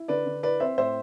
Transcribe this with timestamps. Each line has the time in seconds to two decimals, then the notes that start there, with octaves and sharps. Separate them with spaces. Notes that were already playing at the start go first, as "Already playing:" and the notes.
Already playing: E4
0.08 D3 B4 D5
0.26 D3
0.43 E4 B4 D5
0.60 C4 C5 E5
0.77 A2 C5 E5